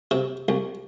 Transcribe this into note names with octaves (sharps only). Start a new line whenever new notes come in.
C3
C2